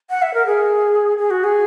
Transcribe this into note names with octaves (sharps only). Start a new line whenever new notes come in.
F#5
E5
A#4
G#4
G#4
F#4
G#4